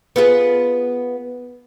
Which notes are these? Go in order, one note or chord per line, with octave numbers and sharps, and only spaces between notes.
B3 F4 G#4